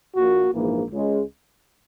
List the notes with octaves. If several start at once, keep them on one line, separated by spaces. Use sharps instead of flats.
A#1 A#2 A#3 F#4
A#1 G#2 E3 A#3
C#2 C#3 G#3